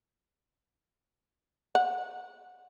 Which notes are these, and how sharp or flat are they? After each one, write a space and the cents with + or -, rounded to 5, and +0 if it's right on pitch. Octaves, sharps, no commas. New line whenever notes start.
F#5 -25